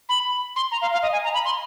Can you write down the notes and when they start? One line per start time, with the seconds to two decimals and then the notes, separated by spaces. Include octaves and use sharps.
0.09 B5
0.56 C6
0.72 A#5
0.82 F5
0.93 F5
1.03 D#5
1.13 G#5
1.24 A#5
1.34 B5
1.45 C6